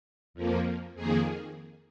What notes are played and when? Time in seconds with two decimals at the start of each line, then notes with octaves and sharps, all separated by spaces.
0.34 F2 F3 A#3
0.95 F2 D#3 A#3 G#4